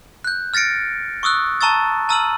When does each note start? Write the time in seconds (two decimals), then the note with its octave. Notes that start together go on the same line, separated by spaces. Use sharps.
0.24 F#6 G6
0.54 F6 A6 A#6 C#7 D7
1.23 C#6 D#6 E6 F#6
1.61 A5 A#5 C#6 E6 A6
2.09 A5 A#5 E6 F6 D#7 F#7